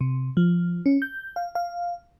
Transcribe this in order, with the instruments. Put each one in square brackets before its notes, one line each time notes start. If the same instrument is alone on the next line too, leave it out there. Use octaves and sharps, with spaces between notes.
[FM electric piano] C3
F3
C#4
G6
F5
F5